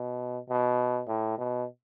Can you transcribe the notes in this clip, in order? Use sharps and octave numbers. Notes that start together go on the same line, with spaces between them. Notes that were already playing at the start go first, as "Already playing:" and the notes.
Already playing: B2
B2
A2
B2